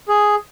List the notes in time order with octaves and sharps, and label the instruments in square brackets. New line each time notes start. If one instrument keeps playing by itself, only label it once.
[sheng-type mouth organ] G#4